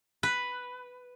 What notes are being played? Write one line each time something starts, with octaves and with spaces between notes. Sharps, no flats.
B4